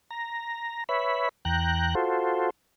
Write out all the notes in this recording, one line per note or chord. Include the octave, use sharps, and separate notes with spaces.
A#5
B4 C#5 E5 B5
E2 G5 A#5 F#6
F4 F#4 A4 C5